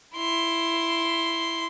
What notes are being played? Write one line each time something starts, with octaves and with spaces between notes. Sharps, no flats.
E4 C6